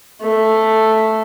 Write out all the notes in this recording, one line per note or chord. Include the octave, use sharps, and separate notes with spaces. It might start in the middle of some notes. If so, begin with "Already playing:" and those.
A3